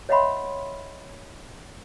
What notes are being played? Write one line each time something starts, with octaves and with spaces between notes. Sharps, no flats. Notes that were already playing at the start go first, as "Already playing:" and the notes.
C#5 D#5 E5 F#5 B5 C6